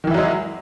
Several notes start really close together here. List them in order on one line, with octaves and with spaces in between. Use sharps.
D#3 E3 E4 F#3 G#3